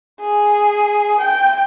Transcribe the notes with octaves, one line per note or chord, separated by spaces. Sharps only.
G#4
G5